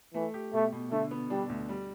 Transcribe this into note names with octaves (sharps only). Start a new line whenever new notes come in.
E3 A3
G4
B2 A3
B2
D3 A3
B3
G3 D4
D2
G3